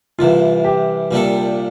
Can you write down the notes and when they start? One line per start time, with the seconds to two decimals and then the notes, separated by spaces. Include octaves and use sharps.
0.19 C2 C3 E3 F4
0.65 G4
1.11 C2 A#2 G3 D4 A4